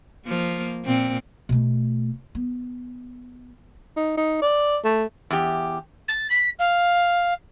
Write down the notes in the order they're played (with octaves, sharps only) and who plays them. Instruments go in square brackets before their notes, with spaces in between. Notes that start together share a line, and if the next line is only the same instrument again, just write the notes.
[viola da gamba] F3 A#3
A#2 C4
[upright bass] B2 A3
B3
[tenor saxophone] D#4
D#4
D5
A3
[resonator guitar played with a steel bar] E2 G4
[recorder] A6
B6
F5